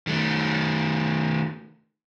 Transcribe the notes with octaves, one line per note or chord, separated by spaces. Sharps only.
D#3 A3